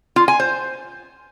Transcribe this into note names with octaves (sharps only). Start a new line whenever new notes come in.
F4
G#5
C5